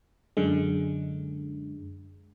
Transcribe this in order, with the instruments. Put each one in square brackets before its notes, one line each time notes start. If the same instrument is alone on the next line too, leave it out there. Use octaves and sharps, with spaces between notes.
[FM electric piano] F#2 D3 G#3